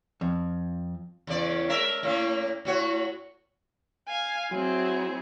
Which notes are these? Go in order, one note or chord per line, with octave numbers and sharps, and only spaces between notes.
F2
E2 C#3 D5
G#3 A#4 E5
A2 A#3 C#4
A2 F#4 C#5
F5 G#5
F#3 C4 E4 G#4